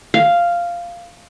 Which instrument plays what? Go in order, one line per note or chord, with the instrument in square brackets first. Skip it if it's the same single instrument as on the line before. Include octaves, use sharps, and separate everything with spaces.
[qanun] F5